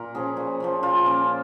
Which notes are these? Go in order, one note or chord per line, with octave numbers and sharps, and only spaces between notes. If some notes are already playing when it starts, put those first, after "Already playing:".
Already playing: A#2 A#4
F3 A#3 C#4 G#4
A#2
F3 A#3 C#4
A#2 F4
A#3 C#4